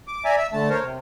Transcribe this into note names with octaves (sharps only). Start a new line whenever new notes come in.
D6
D5 E5 G#5 A#5
E5 E6
D3 A3 A5
A#4 C5 C#5
C3